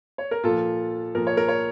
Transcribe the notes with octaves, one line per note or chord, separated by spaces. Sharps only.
C#5
A#4
A#2 F3 F4 A4
A#2 F3 A#4
C#5
A#4
C#5